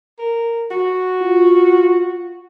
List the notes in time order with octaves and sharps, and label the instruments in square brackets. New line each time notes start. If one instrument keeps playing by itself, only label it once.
[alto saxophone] A#4
F#4
[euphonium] F4